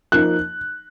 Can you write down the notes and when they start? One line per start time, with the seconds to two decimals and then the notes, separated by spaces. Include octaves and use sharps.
0.12 F3 A#3 D#4 F#6